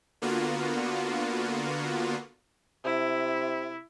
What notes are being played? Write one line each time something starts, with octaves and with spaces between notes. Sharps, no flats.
D3 A#3 B3 F4 F#4
C3 E4